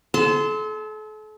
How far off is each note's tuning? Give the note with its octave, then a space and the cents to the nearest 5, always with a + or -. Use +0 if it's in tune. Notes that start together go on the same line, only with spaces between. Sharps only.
A4 -40 A5 +0 C6 -15